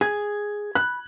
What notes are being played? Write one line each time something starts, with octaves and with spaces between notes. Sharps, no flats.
G#4 G#6
B5 F#6